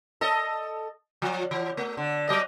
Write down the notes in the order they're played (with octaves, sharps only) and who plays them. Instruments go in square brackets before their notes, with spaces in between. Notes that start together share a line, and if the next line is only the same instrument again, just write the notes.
[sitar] A4 D#5
F3
E3
A3
D3
F#3 D#5